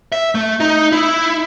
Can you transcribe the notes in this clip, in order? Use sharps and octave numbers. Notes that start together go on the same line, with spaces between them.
E5
A3
D#4
E4